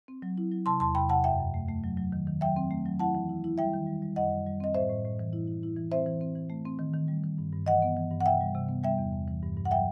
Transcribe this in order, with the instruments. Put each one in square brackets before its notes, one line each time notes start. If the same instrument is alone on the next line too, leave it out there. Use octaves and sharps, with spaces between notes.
[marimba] C4
F#3
E4
F#3
C3 A5 C6
E2 A5 C6
C3 G5 B5
C3 F#5 A5
F#2 E5 G5
F#2
A3
A3
F#3
F#3
D#3
D#3
F#3 E5 G5
C4
A3
F#3
E4 F#5 A5
E3
E4
E4
G3 E5 G5
D#3
G3
G3
F#2 D#5 F#5
G3
G3
C4 D#5
A2 C5 E5
A2
A2
E3
E4
E4
E4
E3
C4 C5 E5
E3
C4
E3
A3
C4
D#3
D#3
G3
D#3
G2
G2
E3 D#5 F#5
B3
E3
G2
F#5
C3 E5 G5
G3
C3
B3
G3 E5 G5
E2
E2
E3
G2
G2
F#5
F#3 E5 G5